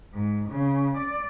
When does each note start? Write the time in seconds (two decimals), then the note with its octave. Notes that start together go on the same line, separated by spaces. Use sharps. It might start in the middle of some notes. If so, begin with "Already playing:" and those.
0.14 G#2
0.48 C#3
0.97 D5